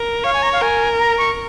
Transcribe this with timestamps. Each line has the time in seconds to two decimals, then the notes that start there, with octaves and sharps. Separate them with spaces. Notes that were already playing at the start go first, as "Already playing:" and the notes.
Already playing: A#4
0.24 C#5 F5
0.34 G#5
0.43 A#5
0.53 F5
0.62 A#4 G#5
0.99 A#5
1.18 C#6